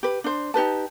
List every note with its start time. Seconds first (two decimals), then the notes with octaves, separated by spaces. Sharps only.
0.03 G4 B4
0.24 D4 C5
0.54 D#4 G4 B4 A5